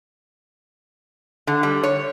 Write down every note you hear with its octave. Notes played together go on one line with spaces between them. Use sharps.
D3
G3
C#5